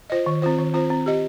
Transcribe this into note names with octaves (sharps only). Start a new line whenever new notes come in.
F4 C5 D#5
D#3
C4 F4 C5
D#3
C4 F4 C5
C4
G4 D#5